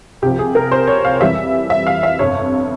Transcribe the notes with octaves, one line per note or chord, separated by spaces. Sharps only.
C2 C3 F3 G4
G#4
A#4
C5
C#5
F5
F2 E3 G3 E5
E5
F5
E5
G1 F2 C3 C#5